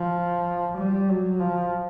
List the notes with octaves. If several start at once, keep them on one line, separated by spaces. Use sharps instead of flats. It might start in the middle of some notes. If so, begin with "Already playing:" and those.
Already playing: F3
G3
F#3
F3